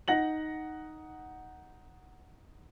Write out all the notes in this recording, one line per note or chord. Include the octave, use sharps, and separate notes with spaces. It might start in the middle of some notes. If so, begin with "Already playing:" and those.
D#4 F#5 A#6 F#7